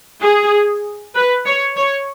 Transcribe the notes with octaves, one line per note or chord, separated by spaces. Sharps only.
G#4
B4
C#5
C#5